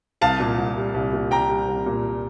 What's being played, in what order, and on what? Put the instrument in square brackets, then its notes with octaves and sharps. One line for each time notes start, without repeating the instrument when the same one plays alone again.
[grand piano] C2 F5 A5
A#2
C2
G3
C2
A#2
C2 G5 A#5
G3
C2
A#2